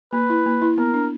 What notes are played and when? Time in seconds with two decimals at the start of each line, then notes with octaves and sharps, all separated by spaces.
0.13 A#3 B4
0.30 E4
0.46 A#3
0.62 E4
0.78 B3 A#4
0.94 D4